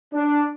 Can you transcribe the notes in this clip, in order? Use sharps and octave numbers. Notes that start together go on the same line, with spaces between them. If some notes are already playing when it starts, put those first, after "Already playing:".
D4